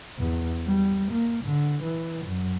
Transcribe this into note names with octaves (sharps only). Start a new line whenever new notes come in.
E2
G3
A#3
D3
E3
F#2